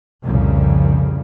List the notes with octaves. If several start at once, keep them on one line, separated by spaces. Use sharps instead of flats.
C2 F2 A#2 C#3